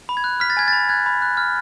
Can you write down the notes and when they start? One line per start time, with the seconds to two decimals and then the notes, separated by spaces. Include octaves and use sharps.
0.09 B5
0.17 G#6
0.24 F#6
0.40 F6 B6
0.50 A6
0.57 G#5 G#6
0.68 B5 A6
0.89 F#6 G#6
1.06 B5
1.22 F#6
1.37 F6